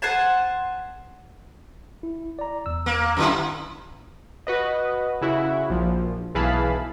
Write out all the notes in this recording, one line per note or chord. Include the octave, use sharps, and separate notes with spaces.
C5 F#5 G#5 A5
E4
D5 A#5
E2 E6
A#3
F#2 D3 E4
F#4 B4 D#5
C#3 E4 F#4
A#1 F3
B1 E3 G#4 F5 A5 B5